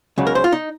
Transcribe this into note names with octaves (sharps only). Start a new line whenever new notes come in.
C#2 C#3 F#3
A#4
C5
F4
D#4